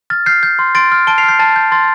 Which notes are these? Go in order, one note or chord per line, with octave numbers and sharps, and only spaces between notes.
F6 A6
F6 G6 C7
G6
C6
C6 A6 D7
F6
A5 D7 G7
C7 F7
F6
G6 C7
A5 A6
G6
C6 A6